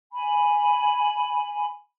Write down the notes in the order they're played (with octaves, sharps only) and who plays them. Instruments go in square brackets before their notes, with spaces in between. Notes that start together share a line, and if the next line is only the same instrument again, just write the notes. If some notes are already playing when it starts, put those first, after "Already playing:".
[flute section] G#5 B5